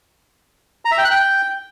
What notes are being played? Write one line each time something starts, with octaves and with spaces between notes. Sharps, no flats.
A#5
E5
G5
F#6
G5